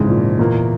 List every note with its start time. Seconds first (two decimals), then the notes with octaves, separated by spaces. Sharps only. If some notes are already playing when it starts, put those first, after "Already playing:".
Already playing: F2 G#2 C#3 E3 G#3
0.08 A#2
0.39 E2 A#2 E3 A#3